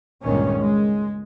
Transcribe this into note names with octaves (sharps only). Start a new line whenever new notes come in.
G1 C#2 A#2 D#3 C#4
G#3